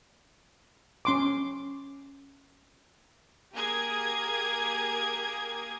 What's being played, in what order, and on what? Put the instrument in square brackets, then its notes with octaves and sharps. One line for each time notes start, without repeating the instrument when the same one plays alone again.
[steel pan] C#4 C6 D6
[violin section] A#3 G4 G#4 A#4 D#6 G#6